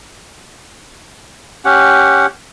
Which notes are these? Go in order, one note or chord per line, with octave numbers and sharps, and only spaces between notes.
C#4 G4 F#5